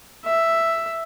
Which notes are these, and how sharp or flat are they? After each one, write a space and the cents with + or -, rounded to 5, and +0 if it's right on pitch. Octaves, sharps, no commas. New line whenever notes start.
E5 +5